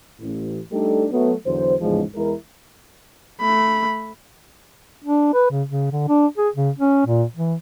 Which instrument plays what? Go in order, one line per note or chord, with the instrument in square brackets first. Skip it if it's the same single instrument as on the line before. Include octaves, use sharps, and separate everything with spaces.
[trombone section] A1
G3 A3 D4 D#4 G4 A4
F#3 A3 B3
E2 D3 F#3 C5
A1 E2 G#2 C#3 F3 G#3
E2 G#3 E4 A#4
[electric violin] A3 B5
[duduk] D4
B4
C#3
C#3
D3
D4
G#4
C#3
C#4
A#2
E3